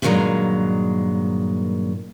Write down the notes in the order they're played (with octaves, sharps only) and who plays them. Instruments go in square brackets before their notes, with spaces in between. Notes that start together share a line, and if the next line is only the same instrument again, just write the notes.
[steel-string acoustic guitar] G2 A#2 D#3 F3 F#3 G#3